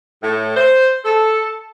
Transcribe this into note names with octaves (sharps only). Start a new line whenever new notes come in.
A2
C5
A4